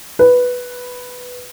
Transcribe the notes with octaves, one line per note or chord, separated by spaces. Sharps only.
B4